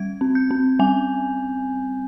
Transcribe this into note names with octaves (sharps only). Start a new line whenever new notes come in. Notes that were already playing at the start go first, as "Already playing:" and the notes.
Already playing: G3 G#6
C4
G6
C4
G3 G#5